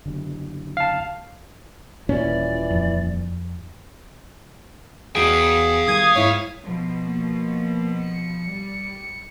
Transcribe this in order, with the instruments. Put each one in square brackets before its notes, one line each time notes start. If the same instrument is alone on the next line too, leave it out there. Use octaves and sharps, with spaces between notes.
[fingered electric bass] F#1 D3
[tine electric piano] F5 A5
[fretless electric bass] D#1 A#2 C#4 [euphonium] E3 [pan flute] D5
[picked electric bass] F2
[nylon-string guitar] E2 F#4 [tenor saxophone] G#4 [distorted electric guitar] F5 G5
[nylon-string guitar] D#3 G3 [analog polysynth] D#6 G#6
[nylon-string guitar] G#2 E4 [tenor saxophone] C#5
[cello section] B2 F3
[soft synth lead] A#3
C#7
[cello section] G3